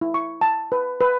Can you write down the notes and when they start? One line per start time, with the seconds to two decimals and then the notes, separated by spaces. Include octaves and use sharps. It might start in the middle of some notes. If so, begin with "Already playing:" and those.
0.01 E4
0.14 C#6
0.41 A5
0.72 B4
1.01 B4